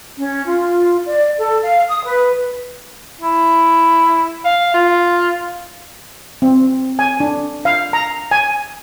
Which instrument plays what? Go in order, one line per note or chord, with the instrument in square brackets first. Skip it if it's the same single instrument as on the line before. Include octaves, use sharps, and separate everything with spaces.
[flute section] C#4
F4
D5
A4
F5
D#6
B4
[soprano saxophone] E4
F5
F4
[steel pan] C4
G#5
D4
F5
A#5
G#5